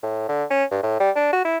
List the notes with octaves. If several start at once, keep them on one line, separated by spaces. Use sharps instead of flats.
A2
D3
C#4
G2
A2
G3
D4
F#4
E4